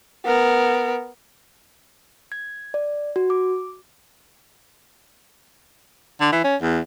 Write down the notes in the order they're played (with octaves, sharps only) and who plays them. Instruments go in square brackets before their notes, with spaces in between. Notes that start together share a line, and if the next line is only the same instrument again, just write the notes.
[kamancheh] B3 A#4
[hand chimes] G#6
D5
F#4
D6
[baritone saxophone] D3
E3
C#4
E2